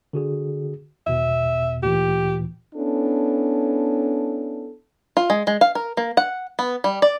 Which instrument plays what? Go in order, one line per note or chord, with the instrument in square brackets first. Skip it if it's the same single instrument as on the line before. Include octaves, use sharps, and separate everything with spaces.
[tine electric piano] D3 F#4 G#4
[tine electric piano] G#1 E2 B2 [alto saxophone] E5
[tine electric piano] D2 A#2 E3 [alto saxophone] G4
[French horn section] B3 C#4 D4 E4 A4
[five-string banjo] F4
G#3
G#3
F5
A#4
A#3
F#5
B3
G3
D5